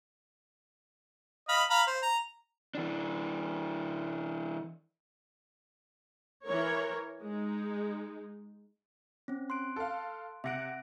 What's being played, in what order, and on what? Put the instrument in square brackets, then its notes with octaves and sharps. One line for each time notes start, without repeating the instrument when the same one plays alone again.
[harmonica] D#5 F5 B5
F5 A#5 B5
C5
A#5
[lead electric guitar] E3 D4
[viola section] E3 A#4 C#5
G#3 D#4
[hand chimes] C4 C#4
C6 F#6 D7
[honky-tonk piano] A4 F5
[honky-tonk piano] C3 F#5 F#6 [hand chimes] E5 A#6 D7